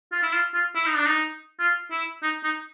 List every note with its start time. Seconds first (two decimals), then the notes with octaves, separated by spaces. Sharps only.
0.12 F4
0.23 E4
0.33 F4
0.54 F4
0.75 E4
0.86 D#4
0.96 D4
1.06 D#4
1.59 F4
1.91 E4
2.23 D#4
2.44 D#4